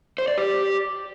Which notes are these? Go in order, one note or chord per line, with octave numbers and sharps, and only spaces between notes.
C5
D5
G4